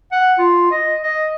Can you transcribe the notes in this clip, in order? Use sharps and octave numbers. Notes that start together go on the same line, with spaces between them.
F#5
F4
D#5
D#5